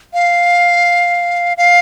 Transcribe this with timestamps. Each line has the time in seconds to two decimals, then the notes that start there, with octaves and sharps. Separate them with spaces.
0.14 F5
1.57 F5